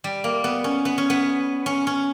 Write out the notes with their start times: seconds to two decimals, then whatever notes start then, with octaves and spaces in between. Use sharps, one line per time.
0.04 G3
0.24 A#3
0.44 B3
0.64 C#4
0.85 B3
0.98 C#4
1.10 B3
1.66 C#4
1.87 C#4